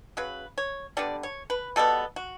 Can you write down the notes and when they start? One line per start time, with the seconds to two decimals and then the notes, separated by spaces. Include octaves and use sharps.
0.17 C#3 F#3 B4
0.58 C#5
0.97 D3 G3 B3 D5
1.23 C#5
1.50 B4
1.76 B2 G3 B3 A4
2.16 F#4